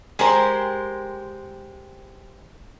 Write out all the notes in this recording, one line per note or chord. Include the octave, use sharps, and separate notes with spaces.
G#3 G4 A#4 C5